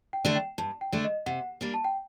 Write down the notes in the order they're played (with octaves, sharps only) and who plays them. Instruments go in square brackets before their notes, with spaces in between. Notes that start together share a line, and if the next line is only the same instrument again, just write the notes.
[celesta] G5
[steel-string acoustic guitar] D3 A3 D4
[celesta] G5
[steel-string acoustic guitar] G2 [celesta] A5
[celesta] G5
[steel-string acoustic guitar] D3 A3 D4
[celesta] D#5
[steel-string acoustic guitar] C3 [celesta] F#5
[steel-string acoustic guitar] G3 A#3 D4
[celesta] A5
G5